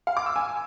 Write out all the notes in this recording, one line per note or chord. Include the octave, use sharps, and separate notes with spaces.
F5
D6
E6
G#5